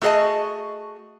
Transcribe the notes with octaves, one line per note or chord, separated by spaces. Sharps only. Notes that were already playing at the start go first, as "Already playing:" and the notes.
A3 F#4 G#4 C5 D#5 A5